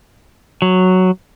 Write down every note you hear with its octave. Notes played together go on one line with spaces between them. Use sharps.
F#3